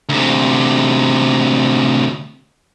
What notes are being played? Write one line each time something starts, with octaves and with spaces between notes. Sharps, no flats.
D2 C3